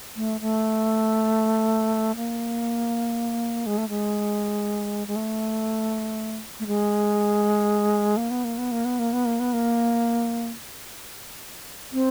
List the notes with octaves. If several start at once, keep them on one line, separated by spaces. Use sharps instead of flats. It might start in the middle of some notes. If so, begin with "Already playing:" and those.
A3
A3
A#3
G#3
A3
G#3
G#3
A3
A3
G#3
A#3
B3
A#3
B3
A#3
B3
A#3
B3
A#3
B3
A#3
C4